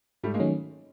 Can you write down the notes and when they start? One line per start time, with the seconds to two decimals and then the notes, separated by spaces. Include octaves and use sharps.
0.23 G#2 G3 A3
0.34 G#3 A#3
0.40 D#3 F#3 A3 C#4